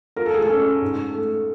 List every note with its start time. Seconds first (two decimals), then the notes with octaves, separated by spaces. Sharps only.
0.16 F4 A#4
0.26 A4
0.34 G#4
0.42 A4
0.49 C#4
0.82 G#2
1.14 A3